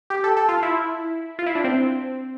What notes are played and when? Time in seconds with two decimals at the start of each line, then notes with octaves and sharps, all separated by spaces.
0.10 G4
0.24 A4
0.37 A4
0.49 F4
0.63 E4
1.39 F4
1.46 E4
1.55 D4
1.64 C4